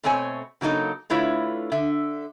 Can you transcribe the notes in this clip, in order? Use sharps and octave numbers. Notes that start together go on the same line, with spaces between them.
B2 A3 C4 C#5 G#5
C#3 F#3 A#3 D#4 A4
D3 A3 E4 F4 B4 C#5
D3 E5